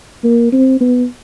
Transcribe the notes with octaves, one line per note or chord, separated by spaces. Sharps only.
A#3
C4
B3